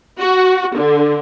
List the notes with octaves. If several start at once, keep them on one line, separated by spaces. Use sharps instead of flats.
F#4
D3